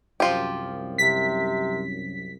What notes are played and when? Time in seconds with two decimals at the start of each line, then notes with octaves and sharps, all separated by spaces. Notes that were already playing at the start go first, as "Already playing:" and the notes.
0.20 C2 F#2 F3 F4 G4
0.98 C3 B6